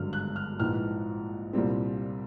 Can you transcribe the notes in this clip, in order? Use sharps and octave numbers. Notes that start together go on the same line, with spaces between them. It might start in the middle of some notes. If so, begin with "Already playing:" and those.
Already playing: G#1 G2 D3 F#3 F6
F#6
F6
A#1 G#2 E3 F6
C2 A#2 G3 C4